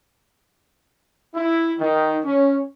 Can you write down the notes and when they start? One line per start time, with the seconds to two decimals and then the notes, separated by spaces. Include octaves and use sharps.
1.35 E4
1.79 D#3
2.24 C#4